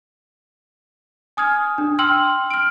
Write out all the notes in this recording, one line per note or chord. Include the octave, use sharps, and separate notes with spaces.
G#5 D#6 F6 G#6
D4
G5 C6 E6 F6 F#7
F6 D7